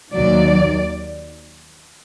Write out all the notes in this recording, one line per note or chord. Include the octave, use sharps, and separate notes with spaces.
D#2 D#3 F#3 D5